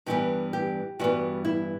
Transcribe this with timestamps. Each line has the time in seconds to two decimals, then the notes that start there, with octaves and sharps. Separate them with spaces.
0.06 G2 E3 G3 B3 G4
0.53 G4
0.99 G2 E3 G3 B3 F#4
1.45 E4